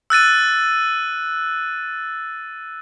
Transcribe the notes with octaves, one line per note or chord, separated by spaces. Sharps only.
E6 F#6 A6 D#7